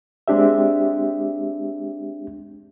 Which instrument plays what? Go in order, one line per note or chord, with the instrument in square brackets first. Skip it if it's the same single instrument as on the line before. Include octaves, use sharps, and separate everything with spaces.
[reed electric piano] G#3 C4 D4 G4 E5